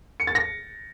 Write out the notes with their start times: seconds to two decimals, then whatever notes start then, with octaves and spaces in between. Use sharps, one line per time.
0.20 C#7
0.27 A6
0.35 A#6